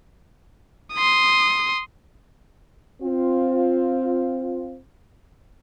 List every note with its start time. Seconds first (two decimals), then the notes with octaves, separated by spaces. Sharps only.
0.94 C6 D#6
3.01 C4 F4